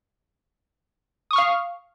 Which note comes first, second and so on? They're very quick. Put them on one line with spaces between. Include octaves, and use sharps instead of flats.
D#6 C#6 F6 F5